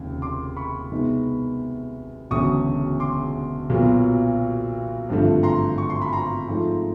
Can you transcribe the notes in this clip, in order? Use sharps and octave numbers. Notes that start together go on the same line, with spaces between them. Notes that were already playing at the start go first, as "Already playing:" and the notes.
Already playing: F1 D#2 C#3
C6 D6
B5 C#6
C2 B2 G#3 B3 D#4
E1 D2 C#3 F#3 C#6 D#6
C6 D6
B1 A#2 F#3 B3
G#1 G2 D3 F3 A3
A#5 C6
C#6
C6
B5
A#5 C6
G#2 F3 A3